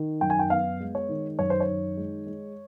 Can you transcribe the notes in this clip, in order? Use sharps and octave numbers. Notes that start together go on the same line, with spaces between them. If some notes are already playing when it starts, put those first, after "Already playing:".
Already playing: D#3
F#2 G5
G#5
G5
B3 F5
G#3
C#5
D#3
F#2 C#5
C5
C#5
D#3
G#3
G#3